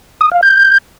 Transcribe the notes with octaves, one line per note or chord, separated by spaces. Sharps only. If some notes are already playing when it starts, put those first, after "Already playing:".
D#6
F5
G6